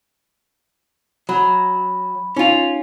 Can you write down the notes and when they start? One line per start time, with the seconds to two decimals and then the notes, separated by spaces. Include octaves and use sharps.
1.29 F#3 B5
2.36 C#4 D#4 F4 F7